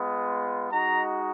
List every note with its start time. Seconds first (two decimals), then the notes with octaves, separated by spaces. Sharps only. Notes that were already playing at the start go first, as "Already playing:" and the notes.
Already playing: G#3 B3 F4
0.70 G#3 D#4 F#4 A#5